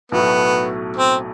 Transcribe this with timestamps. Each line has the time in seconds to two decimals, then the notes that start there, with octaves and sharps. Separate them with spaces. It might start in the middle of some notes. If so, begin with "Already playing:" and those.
0.12 B1 A2 F#3 A3 B3
0.96 C4